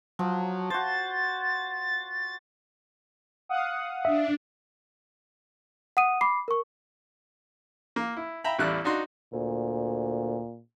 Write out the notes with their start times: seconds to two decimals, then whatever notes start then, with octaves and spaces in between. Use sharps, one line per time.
0.19 F3 F#3
0.70 F#4 C5 A6
3.49 F5 F#5 D#6
4.05 D4 E5
5.97 F#5 D#6 D#7
6.21 B5 D6 C7
6.48 A#4 C#6
7.96 A#3
8.17 E4
8.44 E5 G5 A#5 B5
8.59 A1 E2 G3 E4 D5 F#6
8.84 D4 D#4 F#4 C6
9.33 D2 A#2